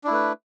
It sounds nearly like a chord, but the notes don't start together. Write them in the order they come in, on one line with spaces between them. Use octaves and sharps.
D4 E4 A3 B4